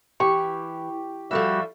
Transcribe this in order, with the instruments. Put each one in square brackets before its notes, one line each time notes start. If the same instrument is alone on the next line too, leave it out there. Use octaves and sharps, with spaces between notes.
[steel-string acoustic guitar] E3 [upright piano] G4 [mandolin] C#6
[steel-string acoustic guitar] F3 A4 E5 [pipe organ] G3 F#4